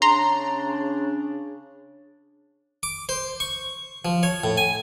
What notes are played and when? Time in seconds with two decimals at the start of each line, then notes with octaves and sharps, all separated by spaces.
0.02 C#3 D4 A#5 C6
2.83 D6
3.09 C5
3.40 C#6
4.05 F3
4.23 C#5
4.44 A2
4.57 G#5